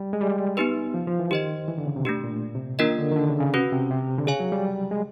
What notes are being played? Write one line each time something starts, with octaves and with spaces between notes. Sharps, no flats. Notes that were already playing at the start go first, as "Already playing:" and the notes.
Already playing: G3
G#3
G3
B3 D#4 G4 B4
F3
F3
E3
D#3 G4 C5 D#5
E3
D3
C#3
C3
B2 A3 D4 G4
A#2
C3
D#3 A#3 D4 F4 A#4 D#5
D3
D#3
D3
C#3
C#3
C3 C#4 F#4 B4
C3
C3
D3
C#3 G#4 C#5 F5 G#5
F#3
G3
G#3